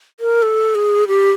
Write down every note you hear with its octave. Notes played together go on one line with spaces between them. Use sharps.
A#4
A4
G#4
G4